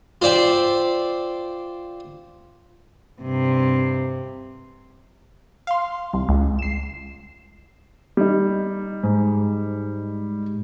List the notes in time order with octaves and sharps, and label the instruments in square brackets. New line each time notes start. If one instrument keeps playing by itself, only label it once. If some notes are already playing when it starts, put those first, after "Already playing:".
[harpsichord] F4 C5 D5 E5 G5
[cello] G2 C3
[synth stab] F5 C6
C2
C#2
C7 E7
[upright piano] G3 D#4
[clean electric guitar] G#2